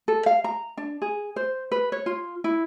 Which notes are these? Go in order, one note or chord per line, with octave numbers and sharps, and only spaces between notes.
A4
F5
A#5
D4
G#4
C5
B4
C#5
F4
E4